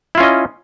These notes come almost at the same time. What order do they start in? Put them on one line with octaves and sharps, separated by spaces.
E4 F4 C#4 D#5